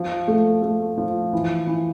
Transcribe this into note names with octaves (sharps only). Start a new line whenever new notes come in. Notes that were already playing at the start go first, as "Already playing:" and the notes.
Already playing: F3
A3
A3
F3
E3
E3